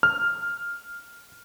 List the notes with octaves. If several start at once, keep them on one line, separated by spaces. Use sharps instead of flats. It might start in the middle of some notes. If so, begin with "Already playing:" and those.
F6